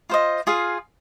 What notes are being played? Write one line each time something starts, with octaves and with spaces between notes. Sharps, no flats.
F4 C5 D#5
F4 G#4 F5